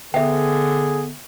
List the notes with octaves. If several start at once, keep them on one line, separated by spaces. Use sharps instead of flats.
D3 B3 G#4 E5 G5